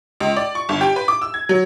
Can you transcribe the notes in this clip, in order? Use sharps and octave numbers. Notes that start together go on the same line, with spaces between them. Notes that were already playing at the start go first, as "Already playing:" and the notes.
C#2
D5
C#6
G1
G4
B4
D6
E6
G#6
F#3